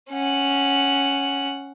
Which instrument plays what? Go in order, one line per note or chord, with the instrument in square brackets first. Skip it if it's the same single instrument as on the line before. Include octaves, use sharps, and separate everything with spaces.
[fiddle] C#4 F#5